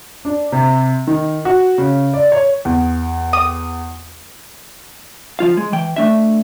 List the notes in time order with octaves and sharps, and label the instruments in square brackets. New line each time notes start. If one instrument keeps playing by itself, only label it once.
[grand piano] D4
C3
D#3
F#4
C#3
D5
C#5
[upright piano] E2
[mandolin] D#6
[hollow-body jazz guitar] F3 F4 F5
G#3
E3 G5
A3 D4 E5